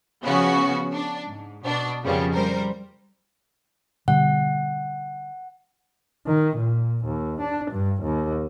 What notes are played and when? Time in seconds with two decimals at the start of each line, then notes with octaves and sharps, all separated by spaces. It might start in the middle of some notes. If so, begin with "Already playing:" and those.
0.24 C#3 F3 B3 C#4 F#4
0.92 D4
1.26 G#2
1.63 B2 D4
2.03 F2 A#2 C#3 F3 G3 B3
2.34 G3 A#4 C5
4.08 B2 D3 G3 F#5
6.27 D#3
6.56 A#2
7.05 D#2
7.41 D4
7.71 G2
8.03 D#2